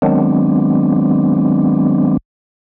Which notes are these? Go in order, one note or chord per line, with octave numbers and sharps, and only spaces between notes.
D#3 F#3 G#3 B3 C4 D4